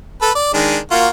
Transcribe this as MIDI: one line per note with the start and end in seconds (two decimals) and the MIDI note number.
0.22 0.30 69
0.22 0.30 71
0.35 0.54 74
0.54 0.78 51
0.54 0.78 56
0.54 0.78 62
0.91 1.08 58
0.91 1.08 65
0.91 1.08 66